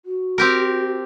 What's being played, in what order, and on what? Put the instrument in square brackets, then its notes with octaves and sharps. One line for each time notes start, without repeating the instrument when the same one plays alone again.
[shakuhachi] F#4
[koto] C4 G4 A#4